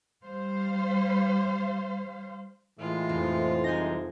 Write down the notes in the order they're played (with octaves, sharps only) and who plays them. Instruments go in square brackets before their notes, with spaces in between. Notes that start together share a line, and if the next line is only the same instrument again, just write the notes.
[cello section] G3 C5 F5
[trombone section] A2 G#3 [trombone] E3 [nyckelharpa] F4
[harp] F1 C4
[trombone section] C2 G#3 D#4 [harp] G#5 G6 A#6